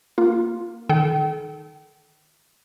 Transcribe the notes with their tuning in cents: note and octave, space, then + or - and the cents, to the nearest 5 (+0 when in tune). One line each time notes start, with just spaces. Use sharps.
A#3 +0 F4 +0
D#3 +0 A4 -35 G5 -35